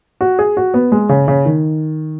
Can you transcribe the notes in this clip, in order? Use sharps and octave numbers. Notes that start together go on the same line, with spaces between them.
F#4
G#4
F#4
B3
G#3
C#3
C#3
D#3